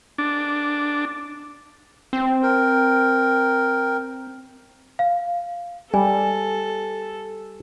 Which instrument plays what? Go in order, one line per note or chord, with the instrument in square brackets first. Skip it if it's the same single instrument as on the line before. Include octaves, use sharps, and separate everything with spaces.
[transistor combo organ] D4
[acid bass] C4
[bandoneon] A#4 G5
[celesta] F5
[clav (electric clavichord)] G3 [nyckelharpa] A4 [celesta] G#5